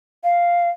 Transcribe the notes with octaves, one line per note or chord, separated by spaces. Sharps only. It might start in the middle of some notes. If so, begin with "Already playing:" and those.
F5